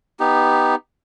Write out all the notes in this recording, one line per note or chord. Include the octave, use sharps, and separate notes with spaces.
B3 D#4 G4